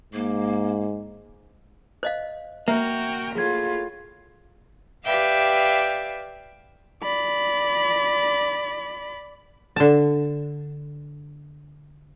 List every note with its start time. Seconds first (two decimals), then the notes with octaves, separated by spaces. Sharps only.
0.13 G#2 A#3
2.03 C5 D#5 F5
2.68 A#3 F#4 E5 G5 A#5
3.35 A2 F4 G#4 G#6
5.03 G4 B4 D5 E5 F5 G5
7.03 D5 B5
9.76 D3 A5